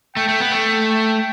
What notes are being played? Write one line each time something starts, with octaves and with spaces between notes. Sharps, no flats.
A3 G5
A3
B3
A3
G5